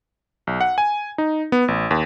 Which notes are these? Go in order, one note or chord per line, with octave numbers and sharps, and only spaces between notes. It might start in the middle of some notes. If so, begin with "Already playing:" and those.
B1
F#5
G#5
D#4
B3
A1
D#2